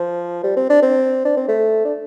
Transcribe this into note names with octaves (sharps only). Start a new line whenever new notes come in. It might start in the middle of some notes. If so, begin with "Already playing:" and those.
Already playing: F3
G3
C4
D4
C4
D4
C4
A3
D4